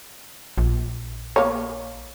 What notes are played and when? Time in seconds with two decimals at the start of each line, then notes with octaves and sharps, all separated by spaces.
0.58 A#1
1.36 A#3 C#5